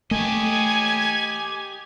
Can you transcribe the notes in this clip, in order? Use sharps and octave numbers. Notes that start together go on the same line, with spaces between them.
A3 G4 D#5 G#5